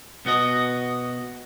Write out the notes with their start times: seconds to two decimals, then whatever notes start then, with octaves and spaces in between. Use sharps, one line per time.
0.25 B2 B3 F#4 D#5